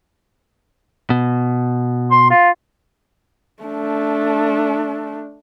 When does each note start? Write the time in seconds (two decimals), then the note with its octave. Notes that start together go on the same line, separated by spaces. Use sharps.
1.10 B2
2.11 C6
2.30 F4
3.63 A3 D4